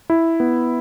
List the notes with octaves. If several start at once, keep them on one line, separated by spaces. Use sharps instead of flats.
E4
B3